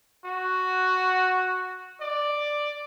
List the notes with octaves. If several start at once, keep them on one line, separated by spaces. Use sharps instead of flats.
F#4
D5